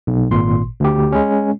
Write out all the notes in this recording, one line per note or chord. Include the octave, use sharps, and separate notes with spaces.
B1
G#1 A#2 C6
D2 G4
G#3 C#4